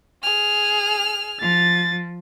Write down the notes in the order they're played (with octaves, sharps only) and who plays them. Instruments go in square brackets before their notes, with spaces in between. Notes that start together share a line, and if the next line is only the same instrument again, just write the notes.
[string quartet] G#4 [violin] F6
[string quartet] F3 [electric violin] A6